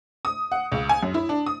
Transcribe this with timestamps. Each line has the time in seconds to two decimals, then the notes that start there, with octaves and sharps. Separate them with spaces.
0.25 D#6
0.52 F#5
0.72 C#2
0.89 G#5
1.03 F#2
1.14 E4
1.29 D4
1.46 D#6